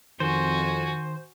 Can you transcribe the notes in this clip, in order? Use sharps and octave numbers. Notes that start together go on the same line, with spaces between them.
F2 D#3 F#4 C5 G#5